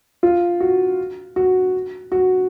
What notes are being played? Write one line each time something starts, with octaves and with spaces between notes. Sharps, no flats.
F4
F#4
F#4
F#4